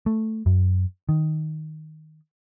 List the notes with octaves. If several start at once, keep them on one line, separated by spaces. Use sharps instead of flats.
A3
F#2
D#3